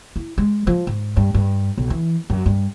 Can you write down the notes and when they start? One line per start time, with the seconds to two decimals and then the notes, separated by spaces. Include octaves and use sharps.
0.16 E4
0.38 G#3
0.67 F3
0.87 G#2
1.17 G2
1.35 G2
1.78 B1
1.90 E3
2.30 F#2
2.46 G2